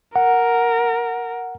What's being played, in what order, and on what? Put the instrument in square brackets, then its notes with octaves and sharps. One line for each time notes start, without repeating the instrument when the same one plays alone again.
[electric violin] A#4 [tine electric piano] F#5